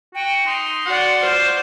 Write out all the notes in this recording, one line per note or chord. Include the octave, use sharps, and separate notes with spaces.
F#4 G5
D#4 C6
F#4 D5 F#5
F4 C5